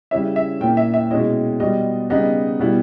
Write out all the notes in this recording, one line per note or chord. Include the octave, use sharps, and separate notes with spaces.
C#3 G3 C#4 E4 E5
E5
A#2 A#3 C#4 E4 G5
E5
E5
B2 G#3 C#4 E4 D#5
B2 G3 B3 D#5
C#3 G3 B3 D#4 D#5
B2 G3 B3 E4